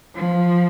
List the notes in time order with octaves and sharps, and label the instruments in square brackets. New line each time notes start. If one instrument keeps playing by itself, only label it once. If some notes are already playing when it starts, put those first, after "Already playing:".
[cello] F3